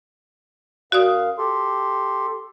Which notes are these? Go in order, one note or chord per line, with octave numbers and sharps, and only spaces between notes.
F#2 F#4 D5 F5 D#6
G4 A4 C6